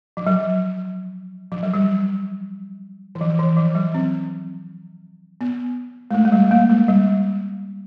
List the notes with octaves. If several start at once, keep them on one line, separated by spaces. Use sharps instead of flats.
F3
F#3
F3
F#3
G3
E3
F3
E3
F3
F#3
C4
B3
G#3
A3
G#3
G3
A#3
G#3
G3